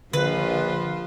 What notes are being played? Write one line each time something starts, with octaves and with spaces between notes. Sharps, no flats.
A#1 D3 F3 F4 B4